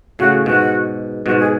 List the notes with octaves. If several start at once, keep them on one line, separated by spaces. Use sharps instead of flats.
A2 C#3 F#4
G#2 B2 F#4
G#2 B2 F#4
G#4